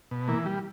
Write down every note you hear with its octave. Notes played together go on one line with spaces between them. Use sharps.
B2
E3 A#3
G3